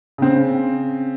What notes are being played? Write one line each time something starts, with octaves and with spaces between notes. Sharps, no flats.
C#3 C4